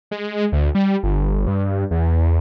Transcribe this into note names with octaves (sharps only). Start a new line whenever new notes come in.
G#3
D2
G3
G1
G2
E2